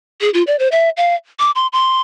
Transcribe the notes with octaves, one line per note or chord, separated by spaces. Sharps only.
G#4
F4
D5
C5
E5
F5
D6
C6
C6